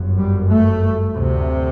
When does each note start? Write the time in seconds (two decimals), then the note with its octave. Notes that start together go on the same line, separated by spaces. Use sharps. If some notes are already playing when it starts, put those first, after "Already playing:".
Already playing: G1 F#2
0.18 G3
0.50 A3
1.16 D2 C3